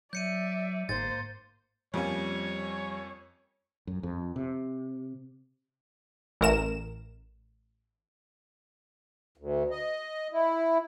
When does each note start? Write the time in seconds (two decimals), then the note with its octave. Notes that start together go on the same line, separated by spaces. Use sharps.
0.13 F#3 D5 E5 G6 C#7 D#7
0.89 G1 G#2 A#3 C5 A6
1.94 F2 F3 G3 A#3 C#4 C#5
3.87 F#2
4.03 F2
4.36 C3
6.41 A1 A#4 E7
9.37 D2
9.70 D#5
10.32 E4